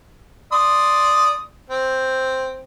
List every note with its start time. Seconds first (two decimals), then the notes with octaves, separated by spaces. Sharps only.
0.52 D5 C6 D#6
1.69 C4